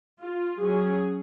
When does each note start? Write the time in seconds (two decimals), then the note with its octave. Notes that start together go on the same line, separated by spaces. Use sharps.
0.19 F4
0.59 F#3 C#4 G#4